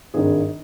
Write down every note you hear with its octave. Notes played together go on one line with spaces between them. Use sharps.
G#1 G2 D#3 G#4